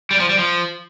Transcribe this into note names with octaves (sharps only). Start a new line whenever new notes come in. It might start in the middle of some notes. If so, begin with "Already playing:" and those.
G3
F3
G3
F3